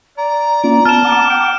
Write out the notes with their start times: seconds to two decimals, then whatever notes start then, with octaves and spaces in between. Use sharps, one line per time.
0.18 D5 A#5
0.64 A#3 C#4 F4 D5
0.85 B3 A5 F6 E7
1.05 F#5 D6
1.30 G5